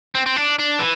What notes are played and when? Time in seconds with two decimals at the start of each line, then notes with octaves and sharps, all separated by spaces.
0.15 C4
0.26 C4
0.36 D4
0.59 D4
0.79 E3